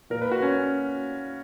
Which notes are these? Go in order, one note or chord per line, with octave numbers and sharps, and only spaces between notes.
A#2 A#4
B4
F#4
C#4